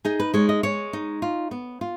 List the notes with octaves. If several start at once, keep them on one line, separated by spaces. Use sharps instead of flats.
D#4 G#4
B4
G#3 C#5
D#5
G#3 C#5
D#4
F4
B3
F4